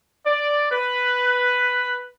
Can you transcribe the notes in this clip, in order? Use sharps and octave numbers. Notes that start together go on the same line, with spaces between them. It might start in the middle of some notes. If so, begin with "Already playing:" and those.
D5
B4